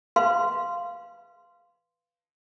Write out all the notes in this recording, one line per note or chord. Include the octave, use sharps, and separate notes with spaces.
B4 F5 C6